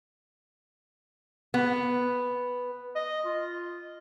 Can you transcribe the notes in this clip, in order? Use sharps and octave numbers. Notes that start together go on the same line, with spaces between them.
B3
D#5
F4